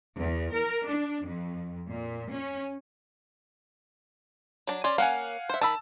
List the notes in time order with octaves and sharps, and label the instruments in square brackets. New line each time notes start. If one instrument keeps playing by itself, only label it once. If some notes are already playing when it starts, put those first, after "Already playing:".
[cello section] E2
A#4
D4
F2
A#2
C#4
[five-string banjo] F#3 D4
[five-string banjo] C#4 G#5 [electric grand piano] D5 C6
[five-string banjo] A#3 C#4 [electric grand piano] F5 F#5 G#5
[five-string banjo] C5 E5
[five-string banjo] D#3 B5 [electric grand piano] A5 E6